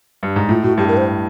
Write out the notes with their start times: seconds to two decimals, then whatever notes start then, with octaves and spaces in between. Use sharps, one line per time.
0.23 G2
0.36 G#2
0.49 A2 F4
0.63 A2 F#4
0.78 G2 G4
0.88 A#4
0.97 C5